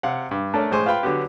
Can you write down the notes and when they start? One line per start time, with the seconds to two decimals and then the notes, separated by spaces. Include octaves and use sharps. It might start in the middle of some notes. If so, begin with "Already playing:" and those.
0.03 C3 F5 F#5
0.31 G2
0.54 A3 C#4 D4 A4 A#4
0.71 A2 G#3 C5 G#5 C#6
0.86 F4 B4 F5 G5 B5 C6
1.03 D3 F#3 B3 F#4 G4